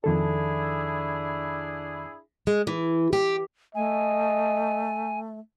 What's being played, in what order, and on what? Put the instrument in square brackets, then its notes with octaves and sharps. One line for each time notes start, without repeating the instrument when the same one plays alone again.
[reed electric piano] F2 D#3 A4 [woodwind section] D4 E4 G#4
[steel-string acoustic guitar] G#3
E3
G4
[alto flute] A3 [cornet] D#5 [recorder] G#5